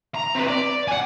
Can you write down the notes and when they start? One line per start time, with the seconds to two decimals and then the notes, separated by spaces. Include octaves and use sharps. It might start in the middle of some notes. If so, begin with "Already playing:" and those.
0.15 A#5
0.35 C3 B4
0.48 D5
0.88 F#5 G#5